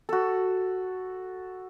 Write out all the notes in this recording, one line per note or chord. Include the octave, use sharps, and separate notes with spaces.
F#4 A4